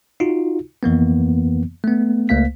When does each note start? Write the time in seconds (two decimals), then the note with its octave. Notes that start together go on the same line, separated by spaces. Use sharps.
0.20 D#4 F4 F#4
0.83 F2 E3 A#3 B3
1.84 A3 B3
2.29 C#2 A3 A#3 F5 B6